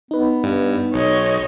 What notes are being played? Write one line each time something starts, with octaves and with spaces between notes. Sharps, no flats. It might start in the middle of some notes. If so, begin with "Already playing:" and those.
B3 D#4 B4
G2
B1 C#5 D#5